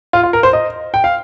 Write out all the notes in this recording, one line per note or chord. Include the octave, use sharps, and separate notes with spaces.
F4
F4
A#4
C5
D#5
G5
F5